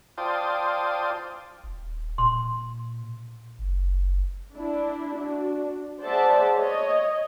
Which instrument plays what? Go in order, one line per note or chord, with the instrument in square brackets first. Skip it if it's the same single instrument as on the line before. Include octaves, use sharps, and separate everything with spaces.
[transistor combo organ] F4 C5 D5 G5 A5 D#6
[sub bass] D#1
[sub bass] A#2 [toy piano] C6
[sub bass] F#1
[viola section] D4 E4
D4 F#4
G#4 C5 D5 E5 F#5 A5
C#5 D#5